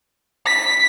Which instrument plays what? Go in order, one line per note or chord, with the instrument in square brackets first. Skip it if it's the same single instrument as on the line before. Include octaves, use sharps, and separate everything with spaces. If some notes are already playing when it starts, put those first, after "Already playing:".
[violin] B6